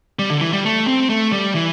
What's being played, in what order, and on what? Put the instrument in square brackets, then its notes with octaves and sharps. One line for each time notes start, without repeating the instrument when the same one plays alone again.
[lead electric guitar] G3
D3
E3
G3
A3
C4
A3
G3
E3